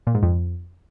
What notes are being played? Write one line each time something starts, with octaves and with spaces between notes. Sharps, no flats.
A#2
G#2
F2